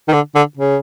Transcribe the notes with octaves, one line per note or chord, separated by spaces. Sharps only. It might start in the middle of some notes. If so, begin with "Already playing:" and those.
D#3
D3
D3
C#3